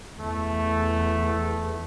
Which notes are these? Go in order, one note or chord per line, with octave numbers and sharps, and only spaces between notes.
E2 A3